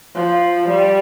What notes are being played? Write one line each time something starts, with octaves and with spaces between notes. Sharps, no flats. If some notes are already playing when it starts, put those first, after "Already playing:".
F3
G3